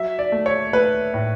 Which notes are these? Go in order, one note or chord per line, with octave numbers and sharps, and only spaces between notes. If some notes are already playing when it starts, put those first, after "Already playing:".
Already playing: F#3 E5
D5
A3
C#5
A3 B4
A2